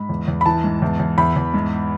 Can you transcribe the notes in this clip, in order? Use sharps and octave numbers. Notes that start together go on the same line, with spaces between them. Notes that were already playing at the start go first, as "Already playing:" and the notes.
Already playing: G#2 B5
E2
E2
B5
E3 A5
G#2
E2
E2
E2 B5
E2
G#2